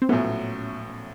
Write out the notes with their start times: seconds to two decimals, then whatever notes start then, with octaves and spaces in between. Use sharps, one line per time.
0.02 C4
0.09 A#1 A2 F#3 A3 B3 C#4